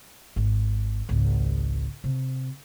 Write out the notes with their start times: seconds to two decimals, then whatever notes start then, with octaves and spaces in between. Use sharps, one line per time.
0.36 G#1
1.09 G#1 C#2
2.04 C3